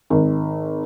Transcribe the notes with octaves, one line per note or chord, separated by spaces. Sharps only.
G#1